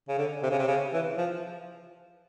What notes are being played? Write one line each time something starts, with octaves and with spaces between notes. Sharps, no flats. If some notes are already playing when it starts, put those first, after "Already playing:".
C#3
D3
C3
C#3
C3
C#3
E3
F3